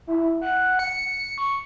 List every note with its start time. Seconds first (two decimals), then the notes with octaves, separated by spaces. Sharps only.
0.07 E4
0.41 F#5
0.79 C#7
1.38 C#6